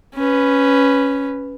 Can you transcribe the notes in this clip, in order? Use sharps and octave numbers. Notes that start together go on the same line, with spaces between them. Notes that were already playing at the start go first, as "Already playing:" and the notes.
C#4 B4